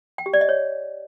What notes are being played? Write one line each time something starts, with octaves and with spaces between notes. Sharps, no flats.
G5
G4
D5
D#5
C#5